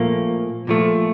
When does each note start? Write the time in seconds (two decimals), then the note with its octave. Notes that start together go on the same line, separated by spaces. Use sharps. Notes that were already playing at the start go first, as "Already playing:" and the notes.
Already playing: A#2 F3 A3 A#3
0.67 A#2 F3 A3